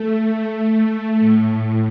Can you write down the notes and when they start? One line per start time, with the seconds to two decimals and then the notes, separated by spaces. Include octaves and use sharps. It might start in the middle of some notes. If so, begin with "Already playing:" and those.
Already playing: A3
1.20 A2